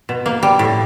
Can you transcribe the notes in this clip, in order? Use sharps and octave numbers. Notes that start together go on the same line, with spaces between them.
B2
A#3
G3
A2